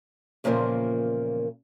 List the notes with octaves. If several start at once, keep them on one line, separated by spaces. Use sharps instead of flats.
E2 A#2 C#3 F3 G#3 A#3